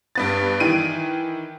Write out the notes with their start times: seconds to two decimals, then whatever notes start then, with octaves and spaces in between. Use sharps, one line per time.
0.15 G2 B3 A6
0.60 D#3 E3 D7 D#7